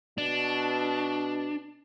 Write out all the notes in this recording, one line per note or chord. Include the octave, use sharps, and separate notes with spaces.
B2 D4